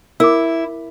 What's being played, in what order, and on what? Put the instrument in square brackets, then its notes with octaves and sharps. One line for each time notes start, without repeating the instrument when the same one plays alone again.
[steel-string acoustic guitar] E4 [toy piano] A#4 D6